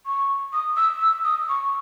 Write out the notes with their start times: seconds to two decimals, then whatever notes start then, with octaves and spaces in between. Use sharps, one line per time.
0.06 C#6
0.53 D#6
0.77 E6
1.01 E6
1.25 D#6
1.49 C#6